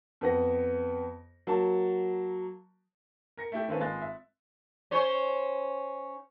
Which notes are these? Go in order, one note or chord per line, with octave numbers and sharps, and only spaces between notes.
F2 B3 A#6
F#3 A#3 A5
A#4 A#6 C#7
A3 E4 G4
D#3 C4 C#4 F4 A4 B4
G#1 G#3 F4 F#6 A6
E5
C#4 C5 C#5